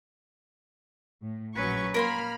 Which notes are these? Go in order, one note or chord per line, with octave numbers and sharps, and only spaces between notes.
A2
A#1 F#3 C#4 B4 C#6
A#3 A#4 G#5 B5 C6 F6